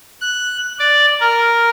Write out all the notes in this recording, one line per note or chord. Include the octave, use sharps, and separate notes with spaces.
F#6
D5
A#4